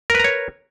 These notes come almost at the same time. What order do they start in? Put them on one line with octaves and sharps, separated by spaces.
A#4 B4 A#5 C#5